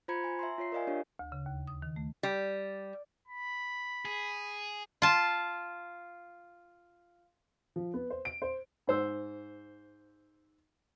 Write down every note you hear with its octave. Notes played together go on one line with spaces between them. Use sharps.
F4 C5 A#5 B5 G#6 C#7
G#5
E5 A#5 C6
F4 C#5 C7
A#4 D5 D#5 F5 G#5
D4 F4 G4 C#5
D2
C#3
D#2
D#6
D#3
A3
G3
B5
G#4
F4 A5
F3
B3
C5
D7
C5
G#2 C5 E6